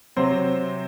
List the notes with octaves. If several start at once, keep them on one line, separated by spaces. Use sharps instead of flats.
C3 F#3 C4 C5